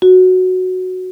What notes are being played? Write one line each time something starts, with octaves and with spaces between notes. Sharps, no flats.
F#4